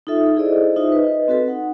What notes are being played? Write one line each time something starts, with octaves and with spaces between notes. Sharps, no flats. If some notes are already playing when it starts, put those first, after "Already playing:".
D#4 F4 A4 E5
E4 G#4 A4 C5 D5 D#5
D#4 F4 C5 E5
B4 D#5
C4 F#4 A4 B4
D#4 F#5